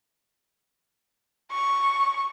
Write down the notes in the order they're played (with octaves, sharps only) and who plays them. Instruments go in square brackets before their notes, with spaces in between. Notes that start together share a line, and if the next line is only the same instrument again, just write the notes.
[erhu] C#6